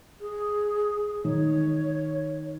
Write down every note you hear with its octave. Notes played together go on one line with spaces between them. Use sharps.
G#4
D#3 C#5